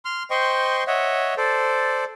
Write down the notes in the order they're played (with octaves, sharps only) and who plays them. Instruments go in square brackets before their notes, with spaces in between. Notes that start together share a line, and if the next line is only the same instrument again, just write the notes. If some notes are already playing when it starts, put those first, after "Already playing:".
[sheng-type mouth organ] C6 F6
C5 D#5 G5 C6 C#6
C#5 D#5 E5 F#5
A4 C5 D5